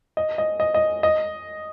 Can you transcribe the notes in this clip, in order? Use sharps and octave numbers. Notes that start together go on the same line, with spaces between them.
D#5
D#5
D#5
D#5
D#5